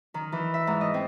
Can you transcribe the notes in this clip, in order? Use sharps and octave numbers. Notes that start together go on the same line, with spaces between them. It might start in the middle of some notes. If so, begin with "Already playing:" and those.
D#3
E3
E5
G#2
D#5
C4